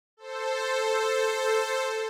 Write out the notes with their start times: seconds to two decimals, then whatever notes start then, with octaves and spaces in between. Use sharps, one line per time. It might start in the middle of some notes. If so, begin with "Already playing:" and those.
0.17 A4 C5